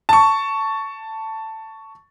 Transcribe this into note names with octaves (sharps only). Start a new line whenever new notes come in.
A5 C#6